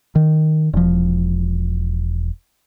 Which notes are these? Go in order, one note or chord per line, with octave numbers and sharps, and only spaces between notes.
D#3
E1 F3